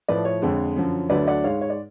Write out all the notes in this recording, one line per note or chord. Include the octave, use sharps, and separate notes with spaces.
A2 F3 A3 B4 D5
C#5
F2 D3 G#3
F#2 D3 F3
D2 D3 F#3 A3 B4 D5
D5 F#5
G#2 G#3 C#5 F5
C#5
D5